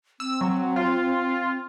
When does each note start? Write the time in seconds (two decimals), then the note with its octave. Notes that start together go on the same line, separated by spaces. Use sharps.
0.20 C4 E6
0.41 F#3
0.76 F4